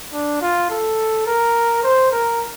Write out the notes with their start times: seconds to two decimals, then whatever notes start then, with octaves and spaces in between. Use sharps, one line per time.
0.13 D4
0.42 F4
0.70 A4
1.27 A#4
1.83 C5
2.12 A#4